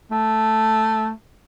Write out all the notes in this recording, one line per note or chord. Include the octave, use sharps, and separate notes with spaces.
A3